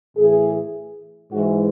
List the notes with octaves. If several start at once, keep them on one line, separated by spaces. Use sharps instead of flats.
A2 E3 G#4
G#2 E3 F#4